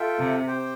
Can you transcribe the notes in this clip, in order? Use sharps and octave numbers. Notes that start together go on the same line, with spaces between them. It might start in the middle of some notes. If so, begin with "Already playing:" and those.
Already playing: F4 A4 E5 G5
C3
G4 C5 G5